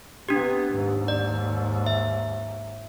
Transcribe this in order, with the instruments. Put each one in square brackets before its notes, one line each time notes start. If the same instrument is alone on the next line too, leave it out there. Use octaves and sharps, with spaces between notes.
[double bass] C3 B3 [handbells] D4 G4
[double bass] D#2 G#2
[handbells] D5
E5